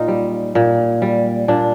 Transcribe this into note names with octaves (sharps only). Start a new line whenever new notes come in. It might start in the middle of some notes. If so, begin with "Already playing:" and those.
Already playing: A#2 D#4 F4
G3
A#2
G3
A#2 D4